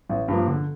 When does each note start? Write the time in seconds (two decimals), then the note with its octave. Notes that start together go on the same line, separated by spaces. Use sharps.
0.10 A1
0.28 G2 F3 A#3
0.48 D3